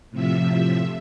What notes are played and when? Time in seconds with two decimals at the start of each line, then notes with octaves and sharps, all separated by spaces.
0.11 A2 C3 F3 E5